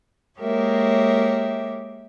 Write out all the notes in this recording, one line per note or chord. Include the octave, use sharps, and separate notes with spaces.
G#3 A#3 G4 A#4 C#5 E5